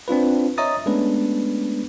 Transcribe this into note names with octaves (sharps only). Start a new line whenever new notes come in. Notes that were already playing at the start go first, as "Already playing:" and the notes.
C4 D4 F4 B4
C#5 D#5 E5 A#5 D#6 A6
G#3 A3 B3 C#4 D4 B4